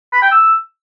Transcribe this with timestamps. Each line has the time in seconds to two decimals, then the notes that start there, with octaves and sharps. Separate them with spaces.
0.13 B5
0.22 G5
0.32 E6